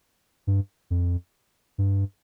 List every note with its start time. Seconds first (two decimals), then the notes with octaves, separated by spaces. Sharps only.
0.47 G2
0.90 F2
1.78 G2